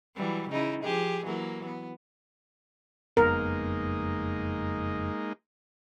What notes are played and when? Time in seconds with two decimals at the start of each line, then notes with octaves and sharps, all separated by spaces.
0.16 E3 F#3 G3
0.50 C#3 D#4 E4
0.83 F3 G4 G#4
1.25 E3 F#3 A#3
1.66 B3
3.17 F#1 F2 G#3 A#3 B3 D#4 A#4